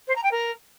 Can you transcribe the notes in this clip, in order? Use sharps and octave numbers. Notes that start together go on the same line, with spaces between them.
C5
A#5
G5
A#4